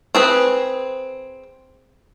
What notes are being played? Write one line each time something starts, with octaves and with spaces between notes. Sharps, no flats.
C4 G#4 B4